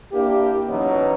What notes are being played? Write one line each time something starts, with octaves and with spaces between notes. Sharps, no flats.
A#3 D4 E4 G4
B2 E3 F#3 B3 C#4 D#4